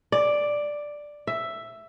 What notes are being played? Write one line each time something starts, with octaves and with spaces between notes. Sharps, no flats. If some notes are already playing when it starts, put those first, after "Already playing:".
D5
E5